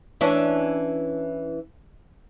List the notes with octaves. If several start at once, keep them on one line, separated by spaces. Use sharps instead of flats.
E3 C#4 D4